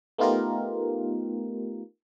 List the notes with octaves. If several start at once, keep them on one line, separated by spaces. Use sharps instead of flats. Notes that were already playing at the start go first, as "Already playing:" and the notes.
A3 B3 D#4 F4 G4 A#4